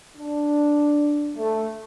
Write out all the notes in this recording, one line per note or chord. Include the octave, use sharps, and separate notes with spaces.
D4
A3